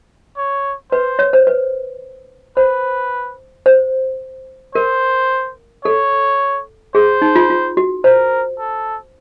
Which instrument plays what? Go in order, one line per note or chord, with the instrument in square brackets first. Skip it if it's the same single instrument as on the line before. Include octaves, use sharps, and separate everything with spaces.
[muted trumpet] C#5
[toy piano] B4 [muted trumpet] C5
[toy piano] C#5
C5
B4
[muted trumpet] B4 [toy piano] C5
[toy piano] C5
[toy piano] A#4 [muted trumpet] C5
[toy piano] A4 [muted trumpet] C#5
[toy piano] G#4 [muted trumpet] C5
[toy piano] D#4
F4
F4
F#4
[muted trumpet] A#4 [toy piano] C5
[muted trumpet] A4